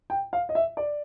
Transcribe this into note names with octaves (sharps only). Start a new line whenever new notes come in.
G5
F5
D#5
E5
D5